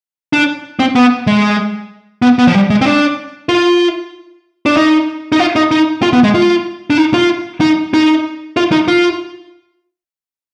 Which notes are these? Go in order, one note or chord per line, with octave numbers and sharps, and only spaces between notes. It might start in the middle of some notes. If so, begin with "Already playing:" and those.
D4
C4
B3
G#3
B3
B3
F3
G3
G#3
C4
D4
F4
D4
D#4
D#4
F4
D#4
D#4
F4
B3
G#3
F4
D4
D#4
F4
D#4
D#4
F4
D#4
F4